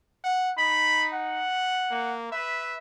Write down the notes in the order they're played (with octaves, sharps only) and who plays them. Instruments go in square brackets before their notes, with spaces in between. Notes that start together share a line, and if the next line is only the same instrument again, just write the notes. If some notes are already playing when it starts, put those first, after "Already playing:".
[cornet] F#5
[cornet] D#4 [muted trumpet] B5
[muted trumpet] F#5
[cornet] A#3
[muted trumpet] B4 [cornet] E5